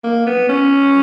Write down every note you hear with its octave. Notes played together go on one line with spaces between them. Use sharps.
A#3
B3
C#4